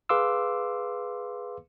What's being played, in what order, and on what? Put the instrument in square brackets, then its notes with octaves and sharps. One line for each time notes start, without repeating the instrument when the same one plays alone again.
[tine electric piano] G#4 B4 F5 C6 D6 E6